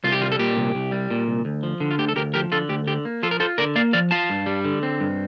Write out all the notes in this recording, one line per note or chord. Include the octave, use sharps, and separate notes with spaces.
C2 F4
G4
G3 F4
A4
A#2 G4
C2
C2
G3
A#2
C2
D2
F3
D3
F4
D2 G4
A4
D2 G4 A#4
F3 G4 A#4
D3 F4 A4
D2 G4
D3 G4
A#3
F3 F4 A4
A#4
F4 A4 C5
D3 A#4 D5
A#3 D5 F5
F3 D5 F5
F4 F5 A5
G2
G3
D3
C4
G2